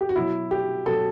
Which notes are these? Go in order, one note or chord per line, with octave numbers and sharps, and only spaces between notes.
G4
F#4
B2 F#3 E4
G4
B2 F#3 A4